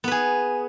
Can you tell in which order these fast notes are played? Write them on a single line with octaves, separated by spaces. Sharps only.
B3 B4 G#4